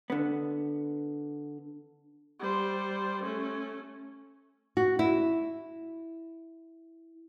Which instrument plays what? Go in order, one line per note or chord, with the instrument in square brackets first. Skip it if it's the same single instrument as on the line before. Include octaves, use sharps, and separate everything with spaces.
[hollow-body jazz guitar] D3 B3
[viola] G3 C5
A3 C#4
[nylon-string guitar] F#4
E4